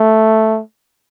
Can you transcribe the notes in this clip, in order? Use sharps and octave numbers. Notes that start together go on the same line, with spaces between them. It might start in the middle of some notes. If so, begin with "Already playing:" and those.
Already playing: A3